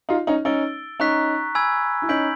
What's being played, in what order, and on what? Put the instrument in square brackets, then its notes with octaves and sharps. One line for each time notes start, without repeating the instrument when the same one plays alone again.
[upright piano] D#4 F4
C#4 D#4
[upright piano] C#4 D#4 [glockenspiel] E6 A6 D7 G7
[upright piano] C#4 D#4 [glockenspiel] A#5 C#6 F#6 B6
[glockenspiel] G#5 B5 E6 G#6
[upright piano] E4
[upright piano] C#4 D#4 [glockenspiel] G6 B6 D7 F#7